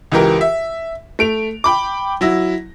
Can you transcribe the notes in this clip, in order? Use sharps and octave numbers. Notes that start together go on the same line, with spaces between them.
C#2 E3 G4 A#4
E5
A3 D7 F7
G5 B5 D6
F#3 E4 A#6